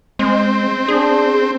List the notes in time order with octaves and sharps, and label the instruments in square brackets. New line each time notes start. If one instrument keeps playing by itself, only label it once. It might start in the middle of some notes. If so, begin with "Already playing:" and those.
[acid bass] G#3 [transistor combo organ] C4
[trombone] D4 [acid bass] G#4